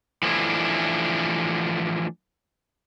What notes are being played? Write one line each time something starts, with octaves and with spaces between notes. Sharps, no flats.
E3 F3 A3 D4 E4